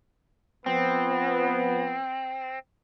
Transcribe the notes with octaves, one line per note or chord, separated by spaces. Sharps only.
F3 B3 C4